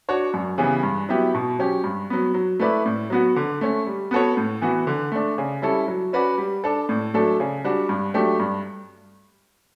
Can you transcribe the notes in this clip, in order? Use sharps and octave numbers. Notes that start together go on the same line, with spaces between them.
D4 F#4 C#5
F#2
C#3 E3 G3 B3
G2
F#3 B3 E4 G4
B2
F#3 C#4 G4
G2
F#3 B3
F#3
A3 E4 B4 D5
A2
F#3 B3 F#4
D3
A3 C#4
G3
B3 F#4 A4 C#5
A2
E3 B3 F#4
D3
A3 D4
C#3
G3 C#4 E4 A4
F#3
C#4 F#4 B4 D5
G3
D4 A4
A2
F#3 A3 D4 A4
C#3
G3 D4 F#4
G2
F#3 A3 D4 G4
G2